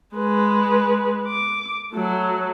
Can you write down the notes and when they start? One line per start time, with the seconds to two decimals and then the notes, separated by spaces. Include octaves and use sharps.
0.15 G#3 B4
1.28 D6
1.92 F#3 A3